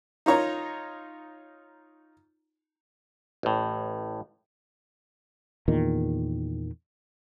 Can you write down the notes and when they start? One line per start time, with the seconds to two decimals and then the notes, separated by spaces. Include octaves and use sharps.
0.26 D#4 F4 C#5 A#5
3.43 A1 A2
5.68 E2 A#2 D#3